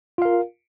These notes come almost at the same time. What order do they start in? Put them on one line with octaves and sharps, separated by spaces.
F4 F5 A#4